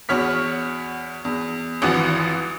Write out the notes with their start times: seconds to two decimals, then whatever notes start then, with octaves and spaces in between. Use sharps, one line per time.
0.09 E2 F#4 C#5 F6 B6
1.25 E2
1.82 G#1 E3 F3 F#4 D#6